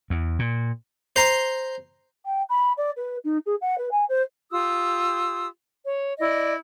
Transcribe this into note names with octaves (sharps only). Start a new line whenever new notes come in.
E2
A#2
C5 A#5 C6
G5
B5
D5
B4
D#4
G#4
F#5
B4
G#5
C5
F4 G4 D#6 E6
C#5
E4 D5 D#5